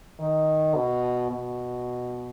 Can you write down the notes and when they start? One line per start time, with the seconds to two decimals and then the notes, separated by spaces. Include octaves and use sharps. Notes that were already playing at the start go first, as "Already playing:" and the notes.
0.19 D#3
0.75 B2
1.31 B2